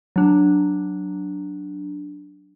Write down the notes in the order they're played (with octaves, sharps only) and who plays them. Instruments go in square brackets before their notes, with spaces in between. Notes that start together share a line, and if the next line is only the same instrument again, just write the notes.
[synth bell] F#3 D4